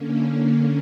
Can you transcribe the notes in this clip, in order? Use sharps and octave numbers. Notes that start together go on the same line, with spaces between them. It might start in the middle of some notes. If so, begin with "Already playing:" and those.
Already playing: D3 A#3 C#4
E4 E5
D4 D5